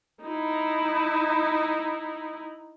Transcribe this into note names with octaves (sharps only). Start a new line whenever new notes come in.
D#4 E4